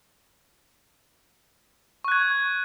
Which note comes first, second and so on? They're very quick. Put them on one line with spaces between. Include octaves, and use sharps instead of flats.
C#6 F#6 G#6